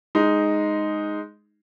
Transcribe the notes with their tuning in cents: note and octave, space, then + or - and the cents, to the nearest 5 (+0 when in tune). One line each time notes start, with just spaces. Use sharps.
G#3 +0 D#4 +0